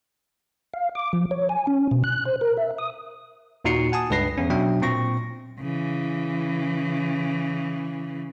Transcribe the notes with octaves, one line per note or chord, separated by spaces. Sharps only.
F5
D6
F3
C#5
G#5
C#4
B2
F#6
C5
A#4
E5
D#6
D#2 A#2 D#4 F#4 C7 C#7
F#5 G#5 A5 D#6
C#2 G2 B4 A#6 C7
E2 C#4
B2 F#3 D4 E5 G5
A#2 C4 C#6 A#6
C#3 E3